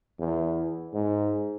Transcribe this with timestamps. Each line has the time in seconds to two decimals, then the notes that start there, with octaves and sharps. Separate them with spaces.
0.19 E2
0.93 G#2